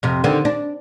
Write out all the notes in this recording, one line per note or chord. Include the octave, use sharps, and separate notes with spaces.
F2 C3
D3 D#3 C4
D4